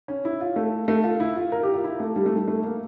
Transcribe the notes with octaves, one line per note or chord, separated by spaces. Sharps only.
C#4
E4
F4
A3
A3
F4
E4
F4
A#4
G4
F4
E4
A3
G3
A3
G3
A3
A#3